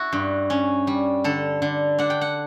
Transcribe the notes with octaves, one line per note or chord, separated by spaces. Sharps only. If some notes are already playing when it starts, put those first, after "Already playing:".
Already playing: E4 F#4
G2
C#4
G3
D3 A4
D3
D4 F#5
G5
F#5